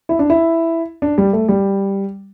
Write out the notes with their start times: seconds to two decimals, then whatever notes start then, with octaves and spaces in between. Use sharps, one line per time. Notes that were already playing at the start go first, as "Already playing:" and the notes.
0.09 E4
0.19 D4
0.30 E4
1.02 D4
1.18 G3
1.33 A3
1.49 G3